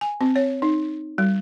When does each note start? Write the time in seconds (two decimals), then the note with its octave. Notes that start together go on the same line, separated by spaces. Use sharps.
0.01 G#5
0.21 C4
0.36 C#5
0.62 D#4
1.18 G3